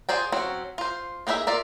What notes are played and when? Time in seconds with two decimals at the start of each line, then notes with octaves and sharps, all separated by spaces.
0.09 F4 G#4 C5 D5 G5
0.32 F#3 C4 C#4 F#4
0.78 F4 C5
1.27 A#3 D#4 G#4 B4 E5
1.47 F4 A#4 D5 E5